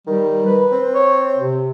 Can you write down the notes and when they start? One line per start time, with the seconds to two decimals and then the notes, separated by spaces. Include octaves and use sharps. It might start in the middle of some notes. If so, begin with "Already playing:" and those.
0.07 D#3 G3
0.46 B4
0.72 C4
0.94 C#5
1.38 C3